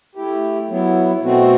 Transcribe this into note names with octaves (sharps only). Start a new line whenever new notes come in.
A3 E4 G4
F#3 B3 E4
B2 A3 C4 F#4